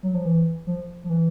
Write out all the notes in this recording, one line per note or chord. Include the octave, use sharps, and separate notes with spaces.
F#3
F3
E3
F3
F3
E3